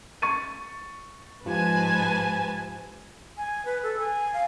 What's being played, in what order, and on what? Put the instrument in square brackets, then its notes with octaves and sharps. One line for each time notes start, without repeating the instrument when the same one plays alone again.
[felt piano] C#6 A6 D#7
[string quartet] G#2 [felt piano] F3 G4 [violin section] B4 G#5 A5
[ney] G#5
B4
A4
G#5
F5